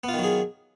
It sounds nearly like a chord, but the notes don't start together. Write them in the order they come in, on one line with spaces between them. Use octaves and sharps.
B3 F4 D#3 F#3 G#4